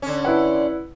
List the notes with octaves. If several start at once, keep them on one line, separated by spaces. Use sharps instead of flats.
D3 C#4
E4 B4 F#5